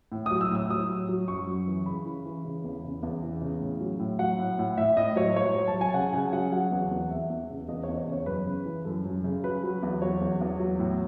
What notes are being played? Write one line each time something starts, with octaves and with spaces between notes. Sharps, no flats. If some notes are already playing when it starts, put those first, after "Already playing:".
A2
D#6
F#3
E6
A2 E6
F#3 D#6
F#3
F#3
F#2 C#6
F#2
E3
C#3 B5
E3
E3
C#3
E2
C#3
E2
E3
C#3
A2
F#3
A2
F#3 F#5
A2
A2
A2 E5
A2 D#5
F#3 C#5
F#3 C#5
F#3
A5
F#3
G#5
C#3 F#5
C#3 G#5
F#3 F#5
F#3 F#5
E2
E2
E2 E5
E2
C#3
E2 D#5
C#5
E2
C#5
C#3
C#5
F#2 B4
C#3
E3
F#2 A4
F#2
C#3
F#3 B4
F#3
E2
F#3 C#5
E2
E2
F#3
A2